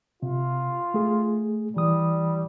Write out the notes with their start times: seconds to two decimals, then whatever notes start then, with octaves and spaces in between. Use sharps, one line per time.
0.22 C3 F4
0.94 A3 G#4
1.76 E3 G3 D#6